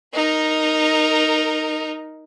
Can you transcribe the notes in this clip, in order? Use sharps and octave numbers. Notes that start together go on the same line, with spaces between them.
D#4 A#4